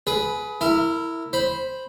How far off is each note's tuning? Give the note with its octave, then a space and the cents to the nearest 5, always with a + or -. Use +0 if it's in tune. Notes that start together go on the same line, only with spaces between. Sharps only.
G#4 +25 B4 +0
E4 +0 A#4 -25
C5 +0 B5 +0